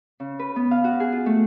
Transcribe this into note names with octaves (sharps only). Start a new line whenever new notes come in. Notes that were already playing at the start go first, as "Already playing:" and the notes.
C#3
B4
B3
F5
F#4
G#4
F4
A3